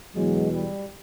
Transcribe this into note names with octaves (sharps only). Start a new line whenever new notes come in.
E2 B2 F#3 G#3
G3